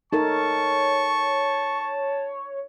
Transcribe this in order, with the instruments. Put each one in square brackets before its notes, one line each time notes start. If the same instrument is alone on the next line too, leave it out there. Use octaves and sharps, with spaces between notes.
[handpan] D#4 A4 A#4 [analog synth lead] C#5 [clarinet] A5 [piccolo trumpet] C#6